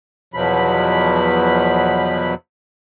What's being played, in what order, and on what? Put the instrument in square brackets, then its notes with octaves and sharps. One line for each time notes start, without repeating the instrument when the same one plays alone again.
[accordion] E2 B2 F3 F#3 B5